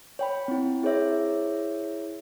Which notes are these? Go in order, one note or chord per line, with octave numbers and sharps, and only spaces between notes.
C#5 G5 B5
C4 E4
E4 G#4 C5 C#5 E5